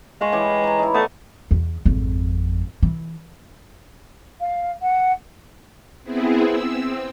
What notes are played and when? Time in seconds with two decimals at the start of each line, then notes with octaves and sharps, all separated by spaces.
0.21 G#3 F4 A5 C#6
0.32 E3 G4 C#5
0.64 A5 A#5
0.79 D#4 E4
0.94 A3 B3 C#5 D#5
1.51 E2
1.86 G#1 F2
2.83 E3
4.40 F5
4.82 F#5
6.04 B3 C4 E4 G#4
6.44 E6
6.75 C4